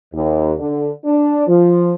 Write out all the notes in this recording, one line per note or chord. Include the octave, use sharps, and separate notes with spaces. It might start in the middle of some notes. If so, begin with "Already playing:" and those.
D#2
D3
D4
F3